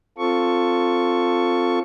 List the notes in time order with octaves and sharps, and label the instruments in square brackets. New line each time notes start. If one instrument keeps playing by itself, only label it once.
[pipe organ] C4 F4 A4 C#6